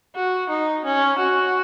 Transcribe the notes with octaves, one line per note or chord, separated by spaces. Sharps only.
F#4
D#4
C#4
F#4